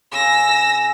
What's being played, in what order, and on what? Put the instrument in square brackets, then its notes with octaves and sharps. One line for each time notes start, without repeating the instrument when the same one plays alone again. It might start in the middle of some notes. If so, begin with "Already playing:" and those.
[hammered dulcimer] C#3 B5 [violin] E6 A#6